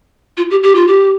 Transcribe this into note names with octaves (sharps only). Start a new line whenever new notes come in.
F4
G4
G4
F4
G4